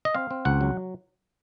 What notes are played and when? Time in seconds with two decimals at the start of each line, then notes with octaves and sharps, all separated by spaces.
0.05 D#5
0.15 C4 F5
0.31 C4
0.45 C#2 F#5
0.61 F#3